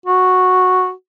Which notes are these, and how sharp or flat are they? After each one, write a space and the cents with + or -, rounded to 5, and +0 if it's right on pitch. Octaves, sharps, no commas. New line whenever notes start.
F#4 -5